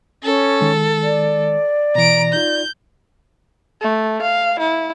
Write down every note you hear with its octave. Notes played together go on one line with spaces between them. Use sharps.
C#4 A4
D#3 G#3
D5
B2 E3 A#5 D7
D#4 F4 G6
A3
F5
E4